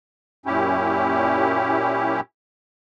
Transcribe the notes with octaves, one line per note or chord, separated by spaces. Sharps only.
F#2 A#2 C#4 E4 G4